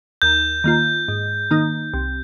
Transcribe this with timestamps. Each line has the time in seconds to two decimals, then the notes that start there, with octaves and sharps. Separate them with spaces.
0.22 D#2 G6
0.64 D#3 A#3 F4
1.08 G#2
1.51 D#3 A#3 D#4
1.94 C2